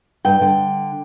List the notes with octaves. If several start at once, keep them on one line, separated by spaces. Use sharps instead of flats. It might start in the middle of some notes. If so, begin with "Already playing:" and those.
G2 G5
D3